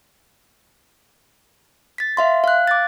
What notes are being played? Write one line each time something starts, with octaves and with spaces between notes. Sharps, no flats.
A6 B6
E5 F5 C6
F5 F#6
D6 A6